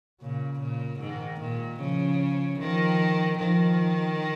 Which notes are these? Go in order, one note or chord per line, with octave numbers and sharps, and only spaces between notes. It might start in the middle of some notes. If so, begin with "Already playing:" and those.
A#2 C#3
A#2
G#2 D#3
A#2
C#3 F3
D#3 F3
D#3 F3